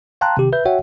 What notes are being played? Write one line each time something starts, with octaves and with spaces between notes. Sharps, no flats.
F5 G5 A5 A#5 C6 F#6
C3 D#3 G4
B4 E5 G6
F#4 C#5 E5 F#5 G5